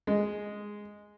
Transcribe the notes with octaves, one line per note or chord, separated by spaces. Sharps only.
G#3